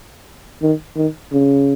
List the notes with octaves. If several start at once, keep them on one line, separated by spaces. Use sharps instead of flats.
D#3
D#3
C#3